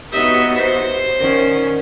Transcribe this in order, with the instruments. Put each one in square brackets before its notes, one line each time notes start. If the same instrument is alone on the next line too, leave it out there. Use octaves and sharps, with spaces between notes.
[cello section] B3 D#4 F#4 [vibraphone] G4 C#5 F#5 [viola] D#5 E5
[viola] C5
[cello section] D#3 C#4 [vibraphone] A#4 D5 F#5